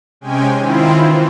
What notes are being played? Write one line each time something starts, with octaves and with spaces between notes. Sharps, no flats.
C3 G#3 C#4 G5 G#5
D#3 C4 E4 F4
E3